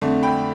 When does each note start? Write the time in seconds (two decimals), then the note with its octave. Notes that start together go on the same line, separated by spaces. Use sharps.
0.01 F2 D3 A3
0.23 G5 B5